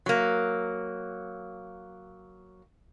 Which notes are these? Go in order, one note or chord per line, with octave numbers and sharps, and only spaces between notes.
F#3 A#3